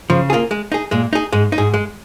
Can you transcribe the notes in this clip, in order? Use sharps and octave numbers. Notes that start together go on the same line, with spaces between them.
C#3 F3
A#3 F4 G#4
G#3
D#4 G#4
A#2 G#3
D#4 G#4
G#2 G#3
D#4
G#2 G#4
G#3